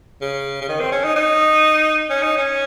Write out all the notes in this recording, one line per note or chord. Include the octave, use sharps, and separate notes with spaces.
C#3
C#3
D#3
C4
C#4
D#4
D#4
C#4
D#4
C#4